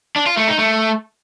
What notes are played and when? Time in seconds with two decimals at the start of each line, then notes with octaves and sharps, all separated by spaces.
0.16 D4
0.26 F4
0.37 A3
0.48 D#4
0.58 A3